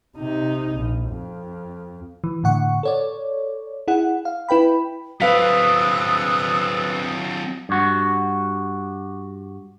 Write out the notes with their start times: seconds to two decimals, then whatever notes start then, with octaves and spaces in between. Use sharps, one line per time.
0.17 C3 D#4
0.76 A#1
1.10 F2
2.24 E3
2.44 A2 D3 F#5 C#6
2.83 A4 C#5 D5
3.88 E4 G#4 F#5
4.25 F5
4.49 E4 B4 G5 B5
5.21 F#3 C4 B4 F5 D#6 E6 F#6 B6
7.69 G2 F#4